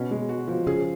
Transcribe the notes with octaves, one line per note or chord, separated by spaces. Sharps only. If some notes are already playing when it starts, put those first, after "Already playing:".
Already playing: B2 C#4
G#3
F#4
F3
C#3 G#4